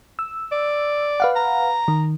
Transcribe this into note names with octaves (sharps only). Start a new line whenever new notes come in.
E6
D5
B4 F5 F#5
A#5
D#3